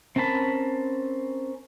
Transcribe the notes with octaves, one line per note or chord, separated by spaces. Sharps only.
C4 C#4 A#4 A5 B5